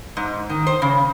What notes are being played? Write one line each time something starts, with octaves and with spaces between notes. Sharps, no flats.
G#2
D#3
C5
C#3